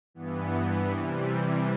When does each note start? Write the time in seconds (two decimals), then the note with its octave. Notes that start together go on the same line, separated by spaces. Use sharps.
0.14 G2 E3 B3
0.92 C3 E3 G3